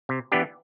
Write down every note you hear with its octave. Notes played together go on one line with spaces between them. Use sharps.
C3
E3 B3 D4 G4